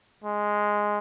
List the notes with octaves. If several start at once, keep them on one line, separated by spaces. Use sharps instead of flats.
G#3